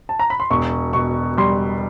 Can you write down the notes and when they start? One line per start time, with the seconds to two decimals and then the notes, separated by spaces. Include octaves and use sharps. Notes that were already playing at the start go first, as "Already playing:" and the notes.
0.09 A5
0.19 A#5
0.30 B5
0.40 C6
0.50 E1 C#6
0.93 B2 C#6
1.37 G3 C6